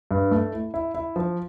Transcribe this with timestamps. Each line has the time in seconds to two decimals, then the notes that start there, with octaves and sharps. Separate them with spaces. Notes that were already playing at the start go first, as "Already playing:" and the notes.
0.11 G2
0.31 A3
0.52 E4
0.74 E4
0.94 E4
1.16 F3